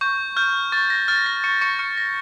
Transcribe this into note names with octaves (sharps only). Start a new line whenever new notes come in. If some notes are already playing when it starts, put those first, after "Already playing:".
C#6 G6
F6 G6
C#6 A6
A#6
F6 A6
A#6
C#6 C#7
C#6 C#7
C#6 F6 C#7
A#6